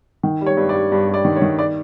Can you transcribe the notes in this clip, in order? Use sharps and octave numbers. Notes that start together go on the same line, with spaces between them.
D#3
G3
C#5
G2
D5
G3
G2
G3
D5
D#3
C#5
D#3
D5